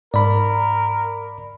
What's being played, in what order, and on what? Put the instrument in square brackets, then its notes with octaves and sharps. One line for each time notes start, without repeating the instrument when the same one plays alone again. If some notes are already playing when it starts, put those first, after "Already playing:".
[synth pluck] G#2 [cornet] A#4 [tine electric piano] D5 B5